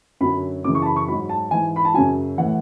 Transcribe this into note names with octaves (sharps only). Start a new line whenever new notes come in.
F#2 D3 F#3 B5
F#2 C#3 E3 D6
C#6
A5
B5
C#6
G#2 F#3 B5
A5
G#2 E3 G#5
B5
A5
F#2 C#3 F#3 G#5
A2 E3 F#5